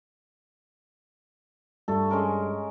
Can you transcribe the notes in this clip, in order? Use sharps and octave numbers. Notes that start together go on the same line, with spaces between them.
G2 A3 A4
G#3 C#4 A#4